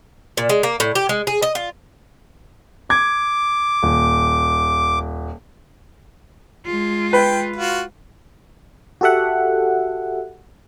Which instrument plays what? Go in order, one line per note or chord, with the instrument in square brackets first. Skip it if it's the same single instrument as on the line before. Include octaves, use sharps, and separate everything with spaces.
[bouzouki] A#2
G#3
A#3
A2
G4
G#3
G#4
D#5
F4
[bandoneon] D6 [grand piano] G#6
[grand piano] D#1
[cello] G#3 F4
[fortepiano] B4 [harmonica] G5
[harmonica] F4 F#4
[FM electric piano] F#4 G4 A4 E5 F#5